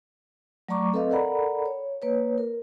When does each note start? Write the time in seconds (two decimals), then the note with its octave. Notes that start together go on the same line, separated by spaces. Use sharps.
0.69 F#3 A3 D5 A#5 C#6 D6
0.93 C4 A4 B4 D#5 F5
1.10 A4 A#4 D5 F#5 A#5 B5
1.66 C#5
2.02 A#3 B4 C#5
2.38 A#4